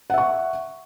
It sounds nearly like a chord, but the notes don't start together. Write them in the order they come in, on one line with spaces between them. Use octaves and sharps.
F#5 E5 C#6